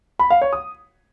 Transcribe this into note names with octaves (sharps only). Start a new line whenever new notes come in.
B5
F5
C#5
D#6